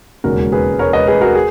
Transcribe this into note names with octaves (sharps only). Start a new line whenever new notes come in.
E1 D#2 C#3 G#3 C#4 F#4 A#4
G#4 B4
A#4 C#5
B4 D#5
G#4 B4
F#4 A#4
G#4